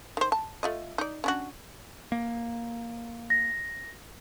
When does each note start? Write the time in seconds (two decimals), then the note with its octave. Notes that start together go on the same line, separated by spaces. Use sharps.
0.17 D#3 C5
0.32 A5
0.63 A3 F4 D#5
0.98 D#4 D5
1.24 C#4 D4 F#4
2.12 A#3
3.30 A#6